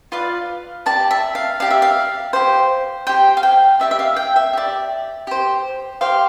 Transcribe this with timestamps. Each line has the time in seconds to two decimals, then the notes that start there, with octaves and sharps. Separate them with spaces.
0.12 F4 B4 D5 F5
0.86 G4 D5 A5
1.11 E5
1.35 F5
1.60 G4 D5 F5
1.70 E5
1.82 F5
2.33 G4 C5
3.07 G4 C5 G5
3.37 F5
3.43 G5
3.80 G4 D5 E5
3.91 E5
3.99 F5
4.16 G5
4.36 E5
4.53 G4 D5
5.27 G4 C5
6.01 G4 C5 F5